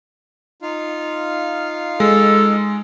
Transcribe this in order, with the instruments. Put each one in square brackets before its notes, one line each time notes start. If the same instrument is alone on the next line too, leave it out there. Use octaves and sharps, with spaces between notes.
[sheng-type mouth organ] D#4 F4 F5
[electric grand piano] G#3 [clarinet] A4